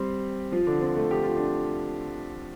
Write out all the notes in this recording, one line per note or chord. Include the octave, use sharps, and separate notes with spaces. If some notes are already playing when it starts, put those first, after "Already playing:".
Already playing: G3 C4 G4 C5
F3 F4
D3 D4
C4
A3
G4
F4
D4